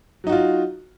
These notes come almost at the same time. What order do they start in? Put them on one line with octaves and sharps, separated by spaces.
F#3 D#4 F#4 F4